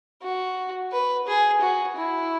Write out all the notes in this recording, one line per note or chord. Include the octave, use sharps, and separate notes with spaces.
F#4
B4
G#4
F#4
E4